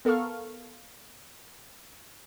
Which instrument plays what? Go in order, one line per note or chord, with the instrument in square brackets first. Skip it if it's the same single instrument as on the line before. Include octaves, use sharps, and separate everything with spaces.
[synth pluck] B3 A4 A#4 F5 C#6 F6